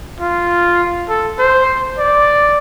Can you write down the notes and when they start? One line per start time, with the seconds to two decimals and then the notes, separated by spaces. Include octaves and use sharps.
0.20 F4
1.09 A4
1.39 C5
1.98 D5